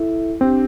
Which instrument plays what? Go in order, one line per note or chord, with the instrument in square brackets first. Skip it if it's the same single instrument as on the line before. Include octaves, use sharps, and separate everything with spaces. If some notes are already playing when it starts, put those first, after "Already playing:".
Already playing: [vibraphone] E4 A4 E5
[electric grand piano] C4 [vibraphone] D4 G4 C5